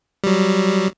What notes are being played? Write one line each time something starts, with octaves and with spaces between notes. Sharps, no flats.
F#3 G3